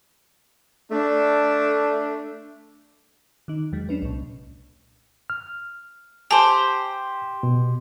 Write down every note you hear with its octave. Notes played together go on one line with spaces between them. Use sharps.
A3 D4
D#3 D#4
E2 F#3 G#3
C#4 D4 B4
C2 A#2
F6
G4 C5 G#5 A5
B2